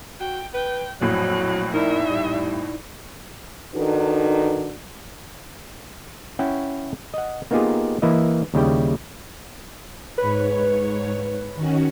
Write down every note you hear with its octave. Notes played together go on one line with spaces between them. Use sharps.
F#4 G5
B4 G5
A#1 F2 A2 F#3 F#6
D#4 E4 A#4 D5 E5
G3
D#3 D4 D#4 F#4 A4 B4
C#4 E4 F#5 G5
D#5 F#5
A#3 B3 D#4 F4 G4 G#4
E3 A#3 E4 D#5
D#2 C#3 G3 E4 G5
G#2 B4 C#5
D#3 C#4 F#4